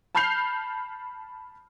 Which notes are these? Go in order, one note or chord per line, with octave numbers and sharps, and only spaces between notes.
A5 B5 F6 G6 C7 F7